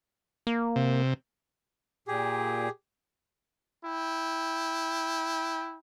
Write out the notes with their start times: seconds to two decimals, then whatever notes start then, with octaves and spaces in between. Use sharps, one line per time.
0.47 A#3
0.76 C3
2.08 A#2 G4 G#4
3.85 E4 G5